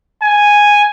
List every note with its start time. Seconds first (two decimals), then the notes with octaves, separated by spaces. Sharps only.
0.22 G#5